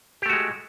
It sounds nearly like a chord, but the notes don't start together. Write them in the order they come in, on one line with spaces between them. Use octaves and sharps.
G4 A3 F#4 G#3